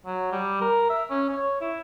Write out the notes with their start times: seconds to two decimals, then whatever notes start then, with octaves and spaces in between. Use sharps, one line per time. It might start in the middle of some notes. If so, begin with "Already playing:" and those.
0.06 F#3
0.32 G3
0.61 A#4
0.89 E5
1.10 C#4
1.29 C#5
1.61 E4